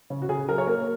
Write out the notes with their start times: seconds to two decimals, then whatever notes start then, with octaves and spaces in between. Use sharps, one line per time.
0.10 C#3
0.22 F#4
0.29 C#3 G#4
0.48 F#3 A#4
0.58 C#5
0.67 A#3 A#4